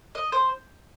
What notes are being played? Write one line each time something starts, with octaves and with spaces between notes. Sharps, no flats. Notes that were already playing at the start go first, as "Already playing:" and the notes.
D#5
C5